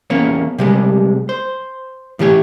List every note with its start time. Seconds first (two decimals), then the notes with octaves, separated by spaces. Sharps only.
0.10 E2 A#3 C#4 C#5
0.58 C3 G3 G#3
1.29 C5
2.19 A2 E3 G4 C#5